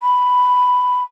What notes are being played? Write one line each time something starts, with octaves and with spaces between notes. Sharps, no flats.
B5